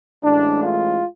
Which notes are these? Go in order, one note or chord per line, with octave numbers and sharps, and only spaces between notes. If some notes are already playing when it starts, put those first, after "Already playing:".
A1 A2 G#3 D4
F4